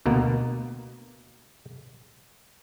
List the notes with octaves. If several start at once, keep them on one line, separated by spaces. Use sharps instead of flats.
D2 B2 A#3 B3